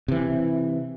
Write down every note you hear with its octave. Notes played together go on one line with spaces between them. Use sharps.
C3 E3